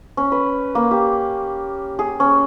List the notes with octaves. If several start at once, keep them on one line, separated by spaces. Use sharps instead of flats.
C#4
B4
A#3
G4
G#4
C#4